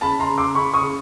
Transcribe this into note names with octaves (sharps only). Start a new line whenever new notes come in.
C#3 A5 B5
A#5 C6
C#3
C6 D6
C#3 B5 C#6
C#6 D#6
C#3